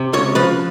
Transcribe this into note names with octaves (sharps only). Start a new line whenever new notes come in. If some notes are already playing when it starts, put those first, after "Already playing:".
Already playing: C3
C#2 C#5
F3 B4